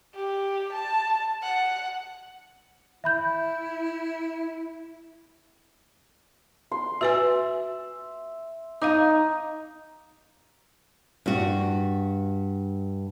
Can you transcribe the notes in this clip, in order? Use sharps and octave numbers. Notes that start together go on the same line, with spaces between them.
G4
A5
F#5
E4 E5 B5 G6
C6
F#4 B4 E5 G#5
D#4 F5 A#5 D6
G2 F#4